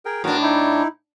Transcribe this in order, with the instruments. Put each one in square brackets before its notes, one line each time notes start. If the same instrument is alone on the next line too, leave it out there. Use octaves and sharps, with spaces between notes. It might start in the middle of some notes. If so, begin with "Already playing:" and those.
[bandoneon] G#4 A#4 G5
[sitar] A2 D4 [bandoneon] B3 F#4 A#4
[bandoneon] D#4 E4